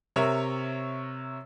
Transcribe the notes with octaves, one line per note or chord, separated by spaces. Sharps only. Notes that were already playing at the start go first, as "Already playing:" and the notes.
C3 A#4 C#5 E5 F7